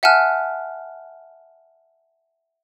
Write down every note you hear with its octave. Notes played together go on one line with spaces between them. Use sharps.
E5 F#5 G#5 A5 F6 F#6